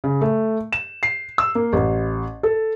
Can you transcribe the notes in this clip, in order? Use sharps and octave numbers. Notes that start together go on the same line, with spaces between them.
C#3
A3
E7
C7
E6
A#3
A1
A4